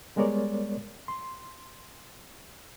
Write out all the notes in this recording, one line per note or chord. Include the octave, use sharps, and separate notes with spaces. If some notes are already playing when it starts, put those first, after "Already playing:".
G3 G#3 B3 A#4 C#5 D5
C6